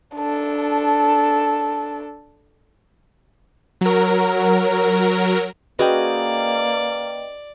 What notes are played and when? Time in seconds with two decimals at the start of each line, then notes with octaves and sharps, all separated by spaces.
0.16 D4 A4
3.81 F#3 A#4
5.79 A#3 C#4 F#4 G#4 B4 D5 D#5 G5